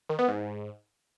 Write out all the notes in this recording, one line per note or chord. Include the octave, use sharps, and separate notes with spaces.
D#3
B3
G#2